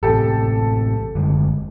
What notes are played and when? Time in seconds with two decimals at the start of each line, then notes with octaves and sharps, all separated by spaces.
0.03 A1 C3 G4 A4
1.15 F#1 D3 G#3